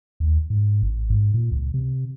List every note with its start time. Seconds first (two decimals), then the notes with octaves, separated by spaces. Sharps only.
0.20 D#2
0.50 G#2
0.82 A1
1.10 G#2
1.34 A#2
1.52 C#2
1.74 C3